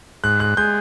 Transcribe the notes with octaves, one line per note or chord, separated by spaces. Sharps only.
G#2 F#6
F#6
G#3 G6